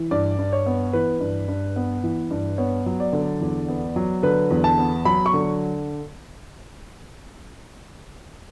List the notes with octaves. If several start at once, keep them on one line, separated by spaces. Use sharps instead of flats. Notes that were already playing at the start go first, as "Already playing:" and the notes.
Already playing: E3
G2 D5
G2
C#5
B3
E3 B4
G2
G2
B3
E3
G2
B3 C#5
F#3
D5
D3
E2
B3
F#3
D3 B4
E2
A5
B3
F#3 B5
C#6
D3